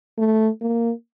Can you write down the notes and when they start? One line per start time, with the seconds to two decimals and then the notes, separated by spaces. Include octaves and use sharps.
0.19 A3
0.62 A#3